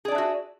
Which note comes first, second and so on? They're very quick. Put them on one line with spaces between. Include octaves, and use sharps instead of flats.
G#4 D5 D4 E5 F#4